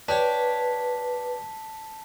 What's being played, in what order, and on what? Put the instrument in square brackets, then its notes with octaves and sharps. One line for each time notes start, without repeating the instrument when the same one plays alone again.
[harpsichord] D4 G4 C#5 [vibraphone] B4 [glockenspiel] A5 B6